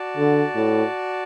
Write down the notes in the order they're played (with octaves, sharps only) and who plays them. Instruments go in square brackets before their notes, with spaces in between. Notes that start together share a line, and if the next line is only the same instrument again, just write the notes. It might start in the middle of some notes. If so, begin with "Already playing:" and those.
Already playing: [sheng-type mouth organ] F#4 D5 A5
[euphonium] D3
A2